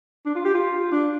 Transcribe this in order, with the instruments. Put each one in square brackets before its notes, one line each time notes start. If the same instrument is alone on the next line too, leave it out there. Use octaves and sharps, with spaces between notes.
[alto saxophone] D4
F4
G4
F4
D4